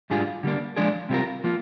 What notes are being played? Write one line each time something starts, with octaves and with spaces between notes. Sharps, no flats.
G#2 G3 D4 F4 G#4
D3 G3 A#3 D4
F3 G#3 D4 G#4 D5
C3 G3 C4 F4 A#4
F3 A#3 F4